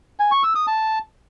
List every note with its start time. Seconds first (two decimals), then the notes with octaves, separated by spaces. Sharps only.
0.19 G#5
0.31 C#6
0.43 E6
0.55 D#6
0.67 A5